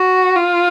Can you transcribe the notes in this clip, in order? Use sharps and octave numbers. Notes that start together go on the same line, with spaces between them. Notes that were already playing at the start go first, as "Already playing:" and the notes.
Already playing: F#4
F4